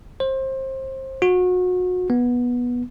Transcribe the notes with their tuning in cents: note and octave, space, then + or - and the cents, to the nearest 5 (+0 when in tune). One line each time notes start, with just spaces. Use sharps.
C5 +25
F#4 -30
B3 -15